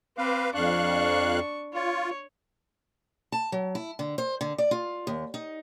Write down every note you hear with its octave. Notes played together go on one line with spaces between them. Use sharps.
C4 B4 F5 D6
F2 D4 F5 C#6 F#6
F4 C#5
A5
F#3
E4
D3
C5
D3
D5
F4
D#2
D#4